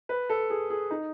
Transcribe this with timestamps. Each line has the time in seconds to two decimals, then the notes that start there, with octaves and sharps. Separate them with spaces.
0.09 B4
0.29 A4
0.50 G#4
0.70 G#4
0.91 D#4